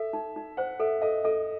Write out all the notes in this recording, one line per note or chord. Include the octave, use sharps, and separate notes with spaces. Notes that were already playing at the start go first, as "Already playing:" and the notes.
Already playing: A4 E5
D#4
D#4
C5 F#5
A4 E5
A4 D#5
A4 D#5